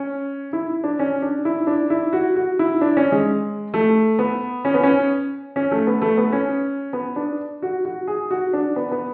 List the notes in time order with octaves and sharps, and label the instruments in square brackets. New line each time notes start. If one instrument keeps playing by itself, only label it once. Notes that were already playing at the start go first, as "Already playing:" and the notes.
Already playing: [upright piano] C#4
E4
D4
C#4
D4
E4
D4
E4
F#4
F#4
E4
D4
C#4
G#3
A3
B3
C#4
B3
C#4
C#4
A3
B3
A3
B3
C#4
B3
D4
F#4
F#4
G#4
F#4
D4
B3
B3